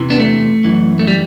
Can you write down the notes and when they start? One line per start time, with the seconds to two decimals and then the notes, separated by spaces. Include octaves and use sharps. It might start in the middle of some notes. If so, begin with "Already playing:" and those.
Already playing: E2 C3 E3
0.10 B3 D4
0.20 A3
0.64 F#2 E3
0.99 A3
1.07 G3